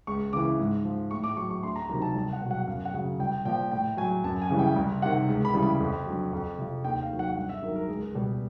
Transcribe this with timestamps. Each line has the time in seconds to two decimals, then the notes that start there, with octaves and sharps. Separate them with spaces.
0.07 C#2 C#6
0.33 C#3 E3 D6
0.59 G#2
0.85 F3
1.11 A2 C#6
1.24 D6
1.37 F#3 C#6
1.51 C#6
1.63 D2 C6
1.76 A#5
1.89 C3 D#3 F#3 A#5
2.02 A5
2.15 C2 A5
2.33 F#5
2.41 B2 F#3
2.51 F#5
2.67 F#2 F5
2.85 F#5
2.94 C#3 F#3
3.19 C2 G5
3.45 A#2 F3 G5
3.71 A2 G5
3.97 F#3 G#5
4.24 F#2 A5
4.42 G#5
4.50 C#3 E3 G3
4.59 G5
4.76 C2
5.02 C3 D#3 F#5
5.28 C#2
5.45 B5
5.54 C#3 E3 G3
5.63 B5
5.80 F2
6.07 D3 F#3
6.33 F2
6.58 C3 F3
6.84 D#2 G5
7.02 F5
7.11 D#3 F#3
7.19 F#5
7.36 G2 F#5
7.49 E5
7.62 D#3 F#3 A#4
7.76 A#4
7.88 C#2 G#4
8.14 B2 G3 G4